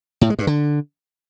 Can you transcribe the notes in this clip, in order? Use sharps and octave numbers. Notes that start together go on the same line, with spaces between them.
A2
G#3
G2
D3